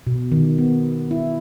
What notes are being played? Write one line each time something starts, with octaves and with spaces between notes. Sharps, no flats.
B2
D#3
B3
E4